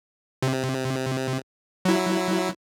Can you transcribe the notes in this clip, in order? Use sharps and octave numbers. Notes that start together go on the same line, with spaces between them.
C3
F#3 E4